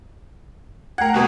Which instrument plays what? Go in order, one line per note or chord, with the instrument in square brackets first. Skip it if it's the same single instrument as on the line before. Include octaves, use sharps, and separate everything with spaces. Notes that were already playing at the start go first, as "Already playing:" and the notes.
[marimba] A3 G5 G#6 [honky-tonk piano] A#4 F#5
[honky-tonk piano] C2 B2 B3